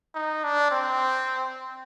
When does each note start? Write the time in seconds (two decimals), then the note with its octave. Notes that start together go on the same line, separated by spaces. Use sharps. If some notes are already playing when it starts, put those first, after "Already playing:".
0.15 D#4
0.44 D4
0.71 C4